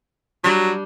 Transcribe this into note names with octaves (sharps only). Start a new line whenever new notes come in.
F#3 G3 D4